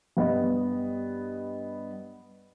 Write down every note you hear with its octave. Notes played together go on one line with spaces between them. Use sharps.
G2 B3 D#5